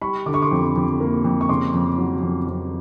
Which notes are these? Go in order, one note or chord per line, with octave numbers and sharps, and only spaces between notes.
G3 B5 C#6
D3 D6
C#6
C6 D6
F2
F2
A#3
F2
C#6
C#3 C6 D6
F2
F#3
F2
F2